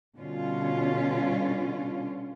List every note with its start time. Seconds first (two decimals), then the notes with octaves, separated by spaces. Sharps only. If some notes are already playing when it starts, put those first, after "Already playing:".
0.19 B2 D3 G3 C#4 F4